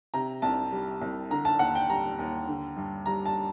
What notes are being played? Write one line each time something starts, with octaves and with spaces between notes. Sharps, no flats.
C3 A#5
C2 A5
G3
C2
D3 A#5
A5
D#2 F#5
G5
G3 A#5
D#2
D3
G2
G3 A#5
A5